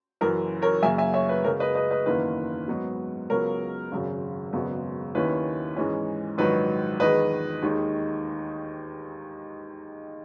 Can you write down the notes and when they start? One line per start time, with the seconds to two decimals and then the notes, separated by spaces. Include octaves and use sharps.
0.21 F#1 F#2 E3 A#4
0.62 A#4 C#5
0.83 F#2 C#3 F#3 A#3 E5 G#5
0.98 E5 G#5
1.14 C#5 E5
1.29 B4
1.44 F#2 C#3 G#3 A#4 C#5
1.60 B4 D#5
1.75 B4 D#5
1.91 B4 D#5
2.06 F#1 E2 D#3 A#3 E4 B4
2.68 G#2 F#3 B3 D#4
3.30 C#2 C#3 F#3 B3 A#4 C#5
3.92 G#1 F#2 C#3
4.53 G#1 F#2 C#3 G#3 B3
5.15 D#2 D#3 A#3 C#4 E4 B4
5.76 G#2 E3 G#3 C#4
6.38 A#1 G#2 D#3 F#3 B4
7.00 E2 D#3 G#3 B4 D#5
7.62 D#2 D#3 G#3 D#4